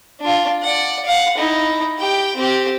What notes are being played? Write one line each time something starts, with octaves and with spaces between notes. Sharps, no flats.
D4 F4
D5 F#5
F5 F#5
D#4 E4
G4 G5
C4 G4